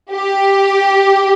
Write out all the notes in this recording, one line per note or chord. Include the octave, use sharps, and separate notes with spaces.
G4